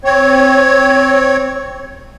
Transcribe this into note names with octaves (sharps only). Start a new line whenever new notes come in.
C4 C#5